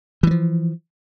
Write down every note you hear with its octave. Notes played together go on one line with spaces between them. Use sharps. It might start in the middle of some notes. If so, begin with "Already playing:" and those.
E3 F3 G3